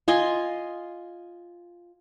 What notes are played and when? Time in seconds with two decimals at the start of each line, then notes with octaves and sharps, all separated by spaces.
0.08 F4 D#5 G#5 C6